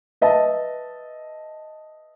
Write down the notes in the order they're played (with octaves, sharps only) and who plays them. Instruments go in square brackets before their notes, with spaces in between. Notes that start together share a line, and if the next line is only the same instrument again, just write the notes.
[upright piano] B4 D#5 E5 A5